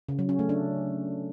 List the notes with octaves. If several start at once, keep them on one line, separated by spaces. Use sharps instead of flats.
C#3
F#3
C#4
A3
D4